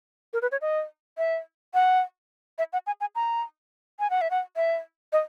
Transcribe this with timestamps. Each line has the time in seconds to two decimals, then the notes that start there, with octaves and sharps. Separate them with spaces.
0.33 A#4
0.42 B4
0.52 C#5
0.61 D#5
1.18 E5
1.74 F#5
2.58 E5
2.73 F#5
2.87 G#5
3.01 G#5
3.15 A#5
4.00 G#5
4.10 F#5
4.21 E5
4.31 F#5
4.56 E5
5.13 D#5